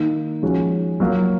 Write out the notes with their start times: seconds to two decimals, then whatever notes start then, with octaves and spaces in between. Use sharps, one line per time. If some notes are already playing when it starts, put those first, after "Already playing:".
Already playing: D#3 A#3 D#4
0.42 F3 G#3 C#4 F#4
1.00 F#3 A#3 F4